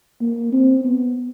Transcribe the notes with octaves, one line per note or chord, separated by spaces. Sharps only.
A#3
C4
B3